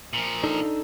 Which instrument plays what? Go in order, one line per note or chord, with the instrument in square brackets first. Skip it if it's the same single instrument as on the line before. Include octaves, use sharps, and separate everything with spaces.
[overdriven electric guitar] A#2 F3
[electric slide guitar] D4 D#4 A4